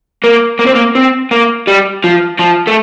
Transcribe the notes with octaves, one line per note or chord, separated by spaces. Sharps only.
A#3
A#3
C4
A#3
C4
A#3
G3
F3
F3
A3